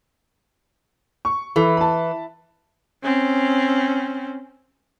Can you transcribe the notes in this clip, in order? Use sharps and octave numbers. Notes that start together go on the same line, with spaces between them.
C#6
E3 A4
A5 B5
C4 C#4